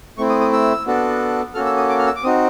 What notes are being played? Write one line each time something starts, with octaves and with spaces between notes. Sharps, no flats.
A3 C4 E4 C#6
D#6
D#6
E6
B3 D4 F#4 A4
A#3 C#4 F#4 A4 F6
E6
D#6
D6
F6
E6
D6
C4 D#4 F#4 D#6